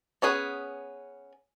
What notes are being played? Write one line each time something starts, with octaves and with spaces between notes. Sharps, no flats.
B3 C#4 G#4 B4